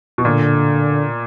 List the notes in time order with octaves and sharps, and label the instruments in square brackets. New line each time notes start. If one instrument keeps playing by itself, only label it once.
[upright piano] B2
[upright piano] A#2 [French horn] D3